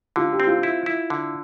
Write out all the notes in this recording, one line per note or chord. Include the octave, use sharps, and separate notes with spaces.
D3 F4
G4
C4
F4
E4
E4
D3